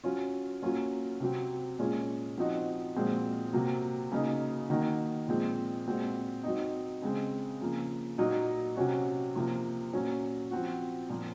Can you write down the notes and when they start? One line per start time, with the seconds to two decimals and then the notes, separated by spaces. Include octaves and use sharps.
0.04 F#3 C#4 F4
0.62 F#3 A#3 C#4 F4
1.20 C3 F#3 C4
1.79 A#2 G#3 C#4 F4
2.38 F3 C4 D#4 F#4
2.95 A#2 F3 G#3 C4 F#4
3.53 C3 F#3 A#3
4.12 C#3 F#3 A#3 D#4
4.70 D#3 A#3 D#4 F#4
5.28 A#2 F3 G#3 C4
5.87 A#2 G#3 C4 F#4
6.44 F#3 C4 D#4
7.02 C#3 G#3 C4
7.61 C#3 F3 A#3
8.18 A#2 F#3 A#3 D#4
8.76 C3 F#3 C#4 F#4
9.35 C3 F3 A#3 F4
9.93 A#2 F#3 C#4
10.51 F3 C4 F#4
11.10 A#2 F3 A#3 F4